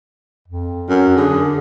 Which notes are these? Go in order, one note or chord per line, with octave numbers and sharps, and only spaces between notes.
F2
F#2
D3 G#4